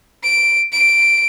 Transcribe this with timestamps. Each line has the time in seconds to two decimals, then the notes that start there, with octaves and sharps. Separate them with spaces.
0.24 D7
0.72 D7